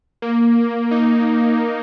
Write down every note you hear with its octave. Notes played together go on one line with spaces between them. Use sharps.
A#3
D#4